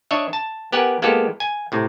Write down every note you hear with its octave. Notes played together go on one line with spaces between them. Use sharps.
D4 C#5 D#5 E5
A5
B3 G4 A#4 F#5 G#5
G#3 A#3 B3 F4 G4 A4
G#5
A2 C3